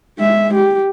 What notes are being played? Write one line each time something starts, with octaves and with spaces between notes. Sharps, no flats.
G#3 E5
G4